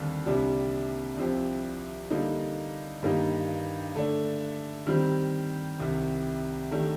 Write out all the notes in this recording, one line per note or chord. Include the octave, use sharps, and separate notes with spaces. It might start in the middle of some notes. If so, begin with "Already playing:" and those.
Already playing: D#2 D3 G3 C4
C2 C3 G3 D4
C2 C3 F3 C4 G4
D3 G3 A#3 D#4
G2 D#3 A#3 D#4 G4
D3 A3 D4
D#3 G3 C4
C2 C3 D#3
D#3 A3 D4 G4